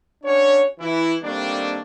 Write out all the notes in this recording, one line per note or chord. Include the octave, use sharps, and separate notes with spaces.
C#4 D4 F#4 C#5
E3 E4
D#3 G3 A3 A#3 C4 D4